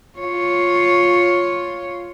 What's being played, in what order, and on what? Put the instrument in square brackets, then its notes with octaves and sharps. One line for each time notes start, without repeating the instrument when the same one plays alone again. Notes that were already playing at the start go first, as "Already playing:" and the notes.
[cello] F4 C#5